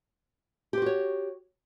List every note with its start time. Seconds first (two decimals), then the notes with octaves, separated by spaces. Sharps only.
0.73 G4
0.77 C5
0.82 F#4
0.86 C#5